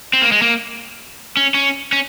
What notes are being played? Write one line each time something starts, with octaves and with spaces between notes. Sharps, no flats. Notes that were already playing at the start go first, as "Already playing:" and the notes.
C4
A#3
G#3
A#3
C#4
C#4
C#4